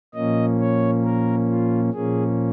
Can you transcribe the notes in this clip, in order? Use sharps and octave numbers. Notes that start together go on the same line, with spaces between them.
A#2 F3 A#3 C#4 D#5
C#5
A#4
F4
A#2 F3 A#3 C#4 G#4